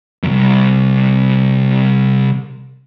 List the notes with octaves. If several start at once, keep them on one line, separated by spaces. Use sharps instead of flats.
C2 F#2